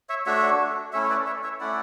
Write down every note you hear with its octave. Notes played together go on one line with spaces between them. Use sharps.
C#5 E5
A3 D4 F#4 C#5 E5
A3 C#4 E4 C#5 E5
C#5
B4 D5
C#5 E5
C#5 E5
A3 C#4 E4 D5 F#5